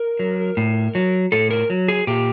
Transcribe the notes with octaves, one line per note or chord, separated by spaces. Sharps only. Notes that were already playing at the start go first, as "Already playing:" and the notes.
Already playing: A#4
F#3
A2
F#3
A2 A4
A#4
F#3
G#4
A#2 G4